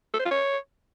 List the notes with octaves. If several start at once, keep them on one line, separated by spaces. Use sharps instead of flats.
A4
C5
F4
C#5